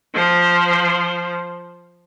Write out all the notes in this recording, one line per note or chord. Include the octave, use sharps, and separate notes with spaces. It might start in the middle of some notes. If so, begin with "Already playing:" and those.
F3 C5